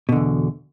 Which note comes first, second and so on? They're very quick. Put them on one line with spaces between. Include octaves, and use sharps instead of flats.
B2 D3 E2